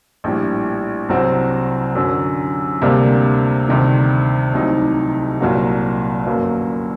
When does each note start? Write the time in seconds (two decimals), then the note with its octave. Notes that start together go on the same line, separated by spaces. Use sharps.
0.24 A#1 A2 G3
1.09 C2 C3 F#3 C4 F#4
1.95 F#2 D3 F#3
2.82 D2 C3 G3 A#3 D4
3.68 D2 C3 D#3 G3
4.54 C2 C3 F#3 A3 D#4
5.41 C2 A#2 F#3 A#3 F#4
6.26 G1 F#2 F#3 A#3